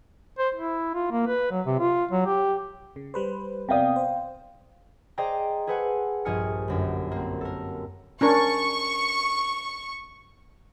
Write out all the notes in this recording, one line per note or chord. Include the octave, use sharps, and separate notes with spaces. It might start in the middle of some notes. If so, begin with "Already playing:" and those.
C5
E4
F4
A#3
B4
F#3
C3
F4
F#3
G4
C#3
G3 B4 C5
C3 B3 D5 F5 G5 D#6
C5
G#4 C5 D5 D#5 G5 A#5
G#4 A4 B4 C5 F#5 G#5
A#1 G2 G#5 D#6 F6 C#7
G1 F#2
A#3 C4
A4 A#4
C#4 D4 A#4 C#6